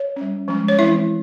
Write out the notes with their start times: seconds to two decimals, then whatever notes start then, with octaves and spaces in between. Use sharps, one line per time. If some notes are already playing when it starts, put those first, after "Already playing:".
Already playing: C#5
0.16 G3 C#4
0.48 F3 G#3 C#4
0.68 C#5
0.79 E3 G#3 C4 E4 E5